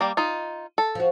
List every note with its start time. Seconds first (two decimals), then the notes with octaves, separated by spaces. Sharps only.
0.01 G3 A#3
0.17 D#4 F4
0.78 A4
0.95 F3 F#4